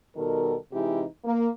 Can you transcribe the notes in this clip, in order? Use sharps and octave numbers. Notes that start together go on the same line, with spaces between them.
B2 D#3 G3 A4 A#4
C3 E3 G#3 D#4 E4 G4
A#3